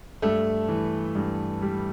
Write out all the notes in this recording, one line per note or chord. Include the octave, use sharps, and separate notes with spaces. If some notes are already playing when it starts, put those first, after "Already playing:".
G2 A3 A4
E3
G2
G3